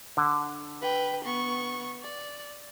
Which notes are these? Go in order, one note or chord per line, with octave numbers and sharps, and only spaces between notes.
D3
B4 G5
B3 C#6
D5